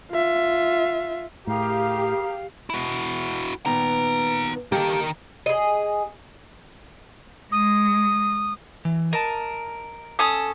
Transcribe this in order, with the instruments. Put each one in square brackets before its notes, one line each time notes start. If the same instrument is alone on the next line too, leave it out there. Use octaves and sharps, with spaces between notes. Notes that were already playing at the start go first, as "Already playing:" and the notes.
[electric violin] F4 E5
[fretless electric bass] A2 [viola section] G4 [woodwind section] G#4 A#4 F5 [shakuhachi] A#5
[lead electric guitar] E4 F#4
[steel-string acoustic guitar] A#2 D#3 B3 [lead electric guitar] B4 A#5
[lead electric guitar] D#3 A#4 [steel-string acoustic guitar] A#3 G4 A4
[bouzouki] G#4 D#5
[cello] G#3 [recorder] D#6
[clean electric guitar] E3
[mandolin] A#4 [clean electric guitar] D#5 A5
[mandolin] C#4 A4 D#6